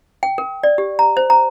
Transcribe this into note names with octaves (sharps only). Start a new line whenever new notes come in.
G5
A#4
D5
G4
A#5
C5
A#5